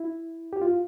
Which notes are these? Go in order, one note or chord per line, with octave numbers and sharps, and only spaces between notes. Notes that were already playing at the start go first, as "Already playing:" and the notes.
Already playing: E4
G4
F4